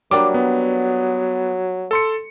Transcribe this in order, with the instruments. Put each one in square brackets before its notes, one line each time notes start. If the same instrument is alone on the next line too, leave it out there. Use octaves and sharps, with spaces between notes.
[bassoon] F#3 [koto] G3 A#3 D4 [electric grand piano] D6
[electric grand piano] B3
A4 C6 C#7